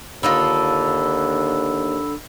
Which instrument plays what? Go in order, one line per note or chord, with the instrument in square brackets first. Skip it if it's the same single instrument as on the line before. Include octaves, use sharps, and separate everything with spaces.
[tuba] D#2 [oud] D3 D#4 F4 [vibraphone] B5 E6